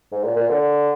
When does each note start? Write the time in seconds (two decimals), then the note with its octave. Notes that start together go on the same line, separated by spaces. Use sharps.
0.12 G#2
0.24 A#2
0.36 A#2
0.49 D3